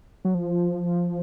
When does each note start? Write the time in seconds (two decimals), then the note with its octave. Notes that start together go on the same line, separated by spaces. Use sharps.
0.25 F#3
0.34 F3